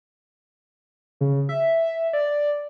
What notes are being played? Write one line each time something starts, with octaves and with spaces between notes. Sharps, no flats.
C#3
E5
D5